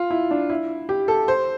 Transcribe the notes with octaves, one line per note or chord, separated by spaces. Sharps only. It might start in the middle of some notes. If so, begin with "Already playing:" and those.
Already playing: F4
E4
D4
E4
G4
A4
C5